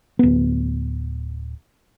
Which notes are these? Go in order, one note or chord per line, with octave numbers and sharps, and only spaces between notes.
D1 B3